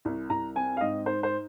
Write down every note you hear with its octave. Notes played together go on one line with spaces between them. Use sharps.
C2
C2 A#5
C4 G#5
F5
G#2 D#5
D#4 C5
C5